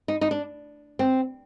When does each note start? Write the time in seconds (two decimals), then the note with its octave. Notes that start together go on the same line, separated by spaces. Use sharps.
0.08 D#4
0.21 D#4
0.31 D4
0.99 C4